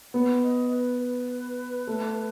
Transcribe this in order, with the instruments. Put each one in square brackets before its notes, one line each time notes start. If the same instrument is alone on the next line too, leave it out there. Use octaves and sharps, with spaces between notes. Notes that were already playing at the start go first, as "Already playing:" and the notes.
[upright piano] B3 [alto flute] F#5
[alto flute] D#5
B4
B4
[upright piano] A3